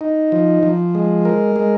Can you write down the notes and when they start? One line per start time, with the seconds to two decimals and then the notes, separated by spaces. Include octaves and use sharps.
0.01 D#4
0.32 F3
0.63 F3
0.95 G#3
1.25 A#4
1.56 G#3